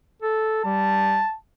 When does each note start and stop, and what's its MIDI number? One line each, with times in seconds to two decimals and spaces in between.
0.22 0.64 69
0.65 1.21 55
0.65 1.36 81